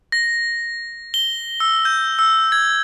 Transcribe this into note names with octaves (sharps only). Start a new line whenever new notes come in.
A#6
G7
E6
G6
E6
G#6